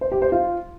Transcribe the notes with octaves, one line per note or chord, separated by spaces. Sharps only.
C5
G4
C5
F4